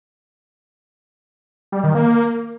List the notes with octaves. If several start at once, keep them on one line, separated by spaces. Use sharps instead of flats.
G3
D#3
A#3